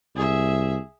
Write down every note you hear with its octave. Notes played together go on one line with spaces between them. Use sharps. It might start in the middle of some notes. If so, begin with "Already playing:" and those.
C2 G#4 E5